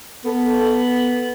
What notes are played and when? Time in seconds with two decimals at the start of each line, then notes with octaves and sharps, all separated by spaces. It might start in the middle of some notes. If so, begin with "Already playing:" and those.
0.25 B3 A4